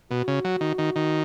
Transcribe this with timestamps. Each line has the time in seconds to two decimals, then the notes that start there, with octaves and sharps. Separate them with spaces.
0.11 B2 F#4
0.28 C#3
0.45 F#3
0.61 D#3
0.78 D#3
0.96 D#3